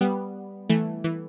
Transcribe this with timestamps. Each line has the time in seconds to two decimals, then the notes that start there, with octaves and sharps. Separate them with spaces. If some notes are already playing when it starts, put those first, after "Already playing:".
0.01 G3 B3
0.69 E3 A3
1.04 E3